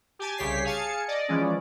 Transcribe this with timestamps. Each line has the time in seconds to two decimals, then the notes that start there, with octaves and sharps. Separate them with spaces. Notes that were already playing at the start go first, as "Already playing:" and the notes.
0.19 G4 G#5 A5
0.37 C2 C#3 G4 C#5 B6 C7
0.64 G#4 F5 G#5 A5 C#7
1.08 D5 D#5
1.28 E3 F3 G#3 C#4 D5